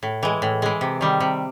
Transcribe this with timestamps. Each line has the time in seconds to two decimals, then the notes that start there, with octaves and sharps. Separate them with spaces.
0.03 A2
0.23 E3 G#3
0.42 A2
0.62 E3 G#3
0.81 C3
1.01 D#3 G3
1.20 C3